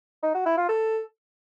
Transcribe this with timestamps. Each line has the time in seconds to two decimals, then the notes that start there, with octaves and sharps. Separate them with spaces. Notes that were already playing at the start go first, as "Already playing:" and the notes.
0.23 D#4
0.34 F#4
0.46 E4
0.57 F4
0.69 A4